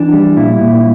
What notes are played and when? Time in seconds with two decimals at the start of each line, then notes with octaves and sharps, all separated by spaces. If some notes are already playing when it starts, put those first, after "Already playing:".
Already playing: E3 D4
0.12 G3
0.36 A#2 E4
0.61 A#2